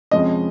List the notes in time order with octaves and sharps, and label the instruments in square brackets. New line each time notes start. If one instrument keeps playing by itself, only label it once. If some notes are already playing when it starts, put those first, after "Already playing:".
[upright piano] F2 C3 F3 G#3 C#4 D#5